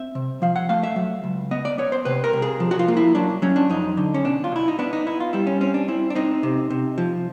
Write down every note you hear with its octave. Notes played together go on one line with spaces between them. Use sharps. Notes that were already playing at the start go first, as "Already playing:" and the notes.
Already playing: C4 E5
C3
F3 F5
F#5
A3 F5
E5
F#3
C#2
B3 D#5
D5
B3 C#5
C5
C3 B4
A#4
C3
G#4
F3
F#4
F4
A#3
E4
F#3 D4
F#3 C#4
D4
F2 D#4
D3
C#4
B2 D4
F4
B2 E4
D#4
B3 D4
D#4
B3 E4
F4
G3 E4
C#4
C4 C#4
D4
C4 E4
D4
C4 D#4
C3
C3
F3